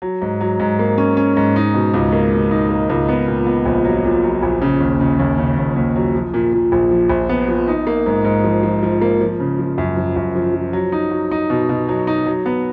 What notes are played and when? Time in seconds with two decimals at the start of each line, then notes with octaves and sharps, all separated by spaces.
0.02 F#3
0.22 G#2
0.41 F#3
0.60 G#2
0.79 A#3
0.98 C#4
1.17 C#4
1.37 G#2
1.56 D#4
1.74 B2
1.94 C#2
2.12 A#3
2.32 B2
2.51 D#4
2.70 A#3
2.90 C#2
3.09 B3
3.28 A#2
3.47 B3
3.66 A#1
3.85 F#3
4.04 A#2
4.24 F#3
4.43 A#1
4.62 C#3
4.80 D#2
5.00 C#3
5.19 D#2
5.38 C#3
5.57 D#2
5.76 D#2
5.96 F#3
6.15 F3
6.34 A#2
6.53 A#2
6.72 A#1
6.91 F3
7.09 A#1
7.29 B3
7.48 F3
7.68 D#4
7.87 A#3
8.06 G#2
8.25 G#2
8.44 F3
8.63 F3
8.83 F3
9.01 A#3
9.21 F3
9.40 C#3
9.59 F3
9.78 F#2
9.97 F3
10.16 F#2
10.35 F3
10.54 F3
10.73 F#3
10.92 D#4
11.11 F#3
11.31 D#4
11.50 B2
11.69 B2
11.89 F#3
12.07 D#4
12.26 F#3
12.46 B3